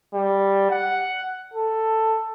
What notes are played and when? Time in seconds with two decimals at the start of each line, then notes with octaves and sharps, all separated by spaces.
0.14 G3
0.71 F#5
1.54 A4